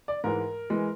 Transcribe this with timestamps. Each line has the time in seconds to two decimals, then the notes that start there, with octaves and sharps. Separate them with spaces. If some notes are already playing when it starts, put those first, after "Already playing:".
0.08 D5
0.24 G#2 E3 G#3 A#4
0.70 E3 G#3